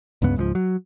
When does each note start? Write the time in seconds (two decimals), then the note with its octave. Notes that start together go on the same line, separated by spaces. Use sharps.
0.22 C#2 G2 C#3 B3
0.36 C#2 G#2 E3 F3
0.55 F#3